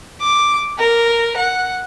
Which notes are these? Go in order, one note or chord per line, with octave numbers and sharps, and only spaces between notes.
D6
A#4
F#5